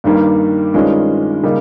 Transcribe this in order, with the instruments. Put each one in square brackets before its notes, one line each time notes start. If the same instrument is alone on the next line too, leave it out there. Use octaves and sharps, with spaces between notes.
[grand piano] G2 D#3 G3 A#3
G2 D#3 G#3 C#4 F4
C#3 G3 A#3 D#4